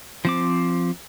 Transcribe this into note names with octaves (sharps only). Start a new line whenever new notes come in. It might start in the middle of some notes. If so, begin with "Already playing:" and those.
F3 C4 D6